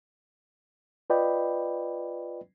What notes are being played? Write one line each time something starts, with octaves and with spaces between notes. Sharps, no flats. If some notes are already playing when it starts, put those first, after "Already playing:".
F4 B4 D5 D#5 G5 B5